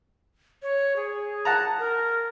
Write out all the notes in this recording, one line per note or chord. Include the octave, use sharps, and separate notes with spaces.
C#5
G#4
F#5 A5 A#5
A#4